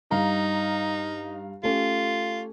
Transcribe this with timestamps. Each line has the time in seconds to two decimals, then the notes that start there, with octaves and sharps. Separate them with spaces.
0.11 G2 D#4 F5 A#5
1.63 A3 C#4 F4 G4